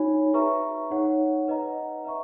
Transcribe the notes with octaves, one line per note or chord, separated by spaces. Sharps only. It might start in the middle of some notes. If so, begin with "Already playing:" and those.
Already playing: D#4 F#4 C#5 G#5 B5
G#4 B4 E5 A#5 C#6
D#4 G#4 C#5 F#5
B4 D#5 F#5 A#5
B4 E5 A#5 C#6